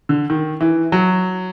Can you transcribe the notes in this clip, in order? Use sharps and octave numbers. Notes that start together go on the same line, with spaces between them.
D3
D#3
E3
F#3